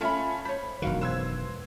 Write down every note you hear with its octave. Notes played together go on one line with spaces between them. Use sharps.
A3 C#4 F4 E5 B5
C5 C#5 B5 B6
E1 F#2 D#3 F#4 F5
B4 C5 E6 G#6